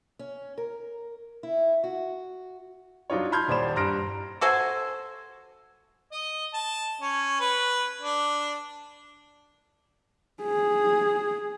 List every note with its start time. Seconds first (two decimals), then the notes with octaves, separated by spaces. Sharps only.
0.19 C#4
0.58 A#4
1.43 E4
1.84 F#4
3.10 F#3 D4 D#4 F4 C#5
3.32 A5 B5 C6 F6 G6 G#6
3.48 D#1 C5 D5 B5 E7
3.76 G2 A#5 C6 F6 A#6 D7
4.41 F#4 A4 C5 G#5
6.12 D#5
6.54 A5
7.01 C#4
7.40 B4
8.01 D4
10.43 G#4